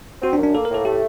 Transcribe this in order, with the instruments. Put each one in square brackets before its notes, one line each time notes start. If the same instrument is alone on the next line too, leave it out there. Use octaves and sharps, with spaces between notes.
[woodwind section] C4 [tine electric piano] F#4
[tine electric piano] D4
[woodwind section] F#2
[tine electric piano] D4
[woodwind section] A#3 [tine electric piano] A4
[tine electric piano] A#4
[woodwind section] A2 [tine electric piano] A4
[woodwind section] A3 [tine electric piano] G4